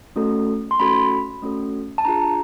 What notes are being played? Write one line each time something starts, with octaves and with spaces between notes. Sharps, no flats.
A3 C#4 F#4 A4
C6
A3 C#4 F#4 A4 B5
A3 C#4 F#4 A4
A5
D4 F4 G#4 A#5
A#5